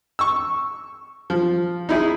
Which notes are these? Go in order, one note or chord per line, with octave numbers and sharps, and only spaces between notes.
C#6 E6
F3
D#4 E4 G#4